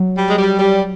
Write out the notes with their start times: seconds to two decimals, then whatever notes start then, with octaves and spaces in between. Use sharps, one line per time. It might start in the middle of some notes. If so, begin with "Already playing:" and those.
Already playing: F#3
0.16 G3
0.27 G#3
0.38 G3
0.59 G3